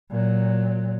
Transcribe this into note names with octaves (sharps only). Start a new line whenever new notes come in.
A#2 F#3